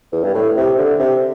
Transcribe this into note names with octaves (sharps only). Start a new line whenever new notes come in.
E2
G2
A2
C3
D3
C3